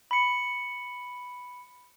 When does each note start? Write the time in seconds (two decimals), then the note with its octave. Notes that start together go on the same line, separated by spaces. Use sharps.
0.11 B5 C#7